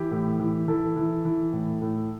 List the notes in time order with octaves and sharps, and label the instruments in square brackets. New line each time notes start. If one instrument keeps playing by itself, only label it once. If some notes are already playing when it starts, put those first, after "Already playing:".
Already playing: [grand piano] E3 G4
A2
E3
E3 A4
E3
E3
A2
A2